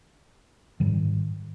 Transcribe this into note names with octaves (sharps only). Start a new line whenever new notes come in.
G#2 D#3 G3